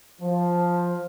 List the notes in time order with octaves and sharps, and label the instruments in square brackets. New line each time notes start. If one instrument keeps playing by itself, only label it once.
[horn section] F3